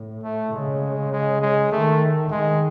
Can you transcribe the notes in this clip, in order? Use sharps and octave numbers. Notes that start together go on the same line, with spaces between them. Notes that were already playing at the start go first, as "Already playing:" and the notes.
Already playing: A2
A3
C#3 G#3
G#3
G#3
D#3 A3
D#3 G#3